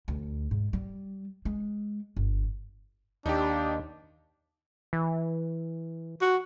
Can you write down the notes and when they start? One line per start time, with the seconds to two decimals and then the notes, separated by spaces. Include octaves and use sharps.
0.08 D2
0.51 G#2
0.73 G3
1.45 G#3
2.17 G1
3.26 D#2 D4 D#4 G4
4.93 E3
6.21 F#4